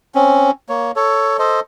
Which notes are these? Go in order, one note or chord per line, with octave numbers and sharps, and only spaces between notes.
C4 C#4
A#3 C#5
A4 C#5
A4 C5 D#5